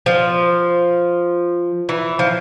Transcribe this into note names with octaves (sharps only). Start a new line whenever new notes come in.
F3
E3
F3